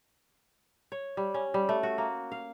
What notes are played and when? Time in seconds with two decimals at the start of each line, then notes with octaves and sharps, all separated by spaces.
0.92 C#5
1.17 G3
1.34 C#4
1.54 G3
1.69 A3
1.83 F#4
1.98 A#3
2.32 F5